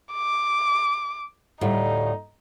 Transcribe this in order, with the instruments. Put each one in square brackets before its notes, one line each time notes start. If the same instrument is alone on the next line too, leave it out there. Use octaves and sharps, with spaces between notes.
[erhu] D6
[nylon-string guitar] D2 A2 G3 [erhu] D#4